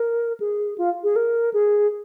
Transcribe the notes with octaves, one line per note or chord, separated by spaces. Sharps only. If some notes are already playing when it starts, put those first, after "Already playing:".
Already playing: A#4
G#4
F4
G#4
A#4
G#4